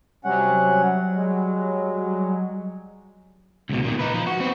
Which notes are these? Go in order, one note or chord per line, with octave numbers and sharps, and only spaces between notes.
C3 F#3 G3 C#4 F#5
G#3
C#2 B2
A#2 D#3
D#4 B4
F3
F#4
B3 C4